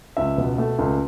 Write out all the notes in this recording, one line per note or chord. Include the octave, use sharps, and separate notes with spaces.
C#2 E5
B2
A3
C#2